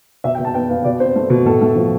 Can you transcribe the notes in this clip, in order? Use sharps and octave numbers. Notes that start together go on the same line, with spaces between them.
B2 E5
G5
B2
A5
B3 G5
B3 F5
B2 D5
C4 C5
A3
B2
A2 A4
A3
F3